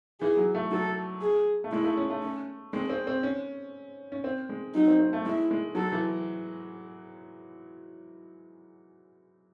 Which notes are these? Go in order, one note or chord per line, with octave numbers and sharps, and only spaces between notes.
E3 G#4
F#3
A3
F#3 A4
G#4
A3
G#3 E4
A3
C#4
A3
C#4
G#3 C4
C4
C4
C#4
C#4
C4
G#3
F#3 D#4
C4
C4
A3
G#3 E4
G#3
F#3 A4
E3